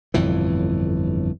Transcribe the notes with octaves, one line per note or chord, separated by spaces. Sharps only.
G1 F2 A2 E3